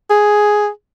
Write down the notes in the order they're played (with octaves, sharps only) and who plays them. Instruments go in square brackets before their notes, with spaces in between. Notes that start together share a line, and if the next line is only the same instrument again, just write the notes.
[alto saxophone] G#4